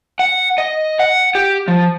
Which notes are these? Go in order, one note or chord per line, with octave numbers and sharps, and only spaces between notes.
F#5
D#5
F#5
G4
F3